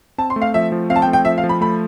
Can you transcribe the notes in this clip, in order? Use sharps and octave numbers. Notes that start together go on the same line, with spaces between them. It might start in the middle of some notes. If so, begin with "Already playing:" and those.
C4 A5
C6
A3
F5
F3 E5
F3
C4 F5
A5
G5
A3
G5
F3 E5
F5
F3
B5
A3 B5